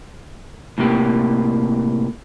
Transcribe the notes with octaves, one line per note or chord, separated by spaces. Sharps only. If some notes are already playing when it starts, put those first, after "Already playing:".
A2 C3 A#3 G4